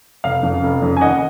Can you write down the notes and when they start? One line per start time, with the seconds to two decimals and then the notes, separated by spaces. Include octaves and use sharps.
0.24 F1 F5
0.43 F2 C#3
0.63 F1
0.82 F2 C#3
0.97 G#5
1.01 D#2 D#5 F#5